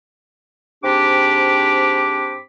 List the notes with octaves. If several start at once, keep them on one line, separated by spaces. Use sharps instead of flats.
G#2 C4 D4 G4 B5 D6